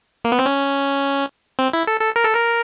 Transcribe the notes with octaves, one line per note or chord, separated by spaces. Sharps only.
A#3
B3
C4
C#4
C4
E4
A4
A4
A#4
A4
A#4